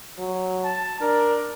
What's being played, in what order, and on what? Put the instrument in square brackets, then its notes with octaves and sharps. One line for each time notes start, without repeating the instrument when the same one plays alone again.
[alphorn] F#3
[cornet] A5
[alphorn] D4 [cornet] A#4